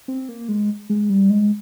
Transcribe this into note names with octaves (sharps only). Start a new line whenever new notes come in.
C4
A#3
G#3
G#3
G3
G#3